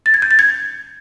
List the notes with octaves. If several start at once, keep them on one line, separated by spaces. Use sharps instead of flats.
A6
G#6
G6
A6
G#6